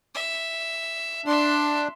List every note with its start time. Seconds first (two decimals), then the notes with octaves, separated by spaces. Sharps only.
0.14 E5
1.26 D4 E5 C6